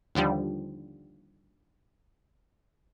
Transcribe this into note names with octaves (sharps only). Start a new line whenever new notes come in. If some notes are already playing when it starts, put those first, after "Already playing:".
D#2 D3 F3 G3